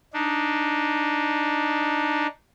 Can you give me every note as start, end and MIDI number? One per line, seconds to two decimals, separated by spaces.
0.13 2.27 62
0.13 2.27 63